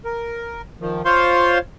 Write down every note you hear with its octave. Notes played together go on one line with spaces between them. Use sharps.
A#4
D#3 F3
F4 C5 C#5 F5 C6